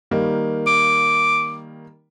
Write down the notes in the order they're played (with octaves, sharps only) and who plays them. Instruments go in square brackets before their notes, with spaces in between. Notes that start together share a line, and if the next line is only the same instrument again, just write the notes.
[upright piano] D#3 G3 A#3
[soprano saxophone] D6